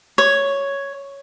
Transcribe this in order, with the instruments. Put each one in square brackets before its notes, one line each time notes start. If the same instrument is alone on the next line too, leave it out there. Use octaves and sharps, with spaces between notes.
[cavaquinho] C#5